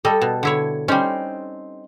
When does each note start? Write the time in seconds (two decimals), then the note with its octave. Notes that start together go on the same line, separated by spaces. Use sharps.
0.05 G3 A4 D#5
0.21 B2
0.43 D3 E4 C#5
0.88 G3 C4 C#4 D#4